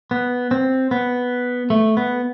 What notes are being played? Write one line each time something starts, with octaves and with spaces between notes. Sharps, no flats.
B3
C4
B3
A3
B3